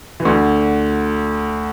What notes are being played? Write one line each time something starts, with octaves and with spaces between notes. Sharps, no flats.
E3
D2 D3